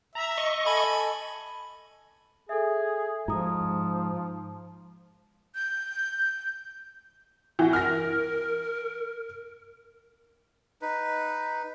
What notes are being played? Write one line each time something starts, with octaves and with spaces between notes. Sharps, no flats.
E5 A#5
D#5 C#6
A4 G#5 B5
G#4 A4 E5
G#2 F3 A#5 D#6
G6
E3 F#4
A#4 F6 A#6
D#4 B4